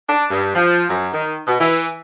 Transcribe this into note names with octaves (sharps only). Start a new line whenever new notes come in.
D4
G2
F3
F#2
D#3
B2
E3